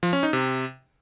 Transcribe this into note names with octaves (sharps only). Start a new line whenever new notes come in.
F3
C#4
D#4
C3